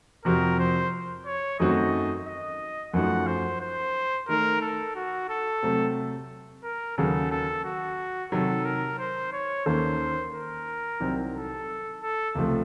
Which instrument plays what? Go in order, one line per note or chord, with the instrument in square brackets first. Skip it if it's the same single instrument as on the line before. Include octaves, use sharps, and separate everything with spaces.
[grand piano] F2 C3 F3 C4 F#4 [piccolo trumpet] A#4
[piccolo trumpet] C5
C#5
[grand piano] F#2 D#3 A3 C4 F#4 [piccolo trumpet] D#5
[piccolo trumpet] D#5
[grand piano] F#2 F3 A3 D#4 F#4 [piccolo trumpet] F#5
[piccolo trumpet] C5
C5
[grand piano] D#3 A3 D#4 [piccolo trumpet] A#4
[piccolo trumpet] A4
F#4
A4
[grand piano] C3 F#3 A3 C4
[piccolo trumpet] A#4
[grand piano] D#2 C#3 F#3 [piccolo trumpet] A4
[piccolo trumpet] A4
F#4
[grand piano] C3 D#3 F#3 [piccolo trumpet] A4
[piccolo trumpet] A#4
C5
C#5
[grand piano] D#2 D#3 A#3 C#4 A4 [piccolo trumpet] C5
[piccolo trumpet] A#4
[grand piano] C2 C3 D#3 F#3 C4
[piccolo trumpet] A4
A4
[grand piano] C#2 C3 F3 A3